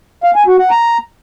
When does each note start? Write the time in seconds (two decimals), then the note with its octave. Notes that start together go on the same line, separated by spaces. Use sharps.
0.24 F5
0.35 G#5
0.47 F#4
0.59 F#5
0.71 A#5